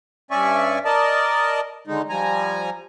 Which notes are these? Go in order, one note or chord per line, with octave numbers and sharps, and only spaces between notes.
G2 C#4 D5 E5 G#5 C#6
A#4 D5 D#5 A5
D3 D#3 G#3 D#4
F3 G3 G#5 A#5